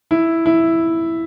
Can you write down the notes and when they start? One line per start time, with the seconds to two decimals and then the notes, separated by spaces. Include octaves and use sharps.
0.11 E4
0.46 E4